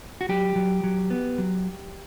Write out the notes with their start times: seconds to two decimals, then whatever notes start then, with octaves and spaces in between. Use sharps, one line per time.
0.21 F#4
0.29 F#3 G4
0.56 F#3
0.84 F#3
1.10 B3
1.38 F#3